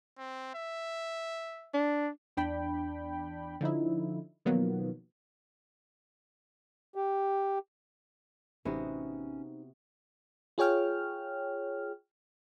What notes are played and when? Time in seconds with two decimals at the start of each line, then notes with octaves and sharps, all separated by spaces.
0.18 C4
0.55 E5
1.74 D4
2.37 E2 D4 G5 B5
3.61 D3 F3 D#4 E4
4.45 B2 D#3 F3 F#3 A#3 B3
6.95 G4
8.65 A1 C3 B3 C#4 D#4 F#4 C5
10.58 F4 G#4 C#5 G5 F6